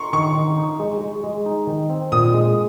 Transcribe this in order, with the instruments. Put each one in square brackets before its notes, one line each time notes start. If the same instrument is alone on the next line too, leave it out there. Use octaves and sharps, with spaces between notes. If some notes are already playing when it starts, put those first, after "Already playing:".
Already playing: [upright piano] A#5 C6 C#6
[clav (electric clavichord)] D#3 [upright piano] C#6
[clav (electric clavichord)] D#3
D#4
G#3
G#3
G#3
D#4
D#3
C4
[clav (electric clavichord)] A#2 [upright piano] D#6
[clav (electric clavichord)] G#3